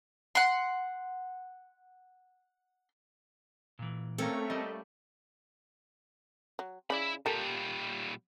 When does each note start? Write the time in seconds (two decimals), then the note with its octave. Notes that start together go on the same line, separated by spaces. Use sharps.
0.35 F#5 C6
3.79 A#2 E3
4.18 A3 A#3 C4 C#4 A4 A#4 C#5
4.50 G3 D#5
6.59 F#3
6.90 C#3 E4 D5 B5
7.26 A#2 G3 G4 A4 A#4